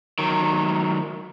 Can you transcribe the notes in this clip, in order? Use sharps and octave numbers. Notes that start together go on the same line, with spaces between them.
D#3 F#3